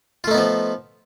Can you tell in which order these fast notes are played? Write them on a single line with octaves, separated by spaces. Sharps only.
F4 A3 D#4 B3 F3